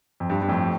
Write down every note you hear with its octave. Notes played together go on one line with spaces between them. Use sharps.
F2
G2
G2
F2 A2